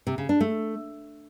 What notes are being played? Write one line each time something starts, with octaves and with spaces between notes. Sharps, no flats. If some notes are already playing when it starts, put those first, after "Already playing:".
C3
C#3
D4
A3